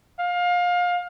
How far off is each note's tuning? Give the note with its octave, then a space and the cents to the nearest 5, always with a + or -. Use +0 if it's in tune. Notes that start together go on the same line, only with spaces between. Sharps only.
F5 +25